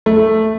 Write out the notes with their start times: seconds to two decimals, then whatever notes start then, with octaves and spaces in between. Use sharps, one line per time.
0.06 A3